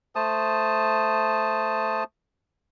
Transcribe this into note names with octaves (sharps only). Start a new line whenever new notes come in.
A3 C5 A5 D#6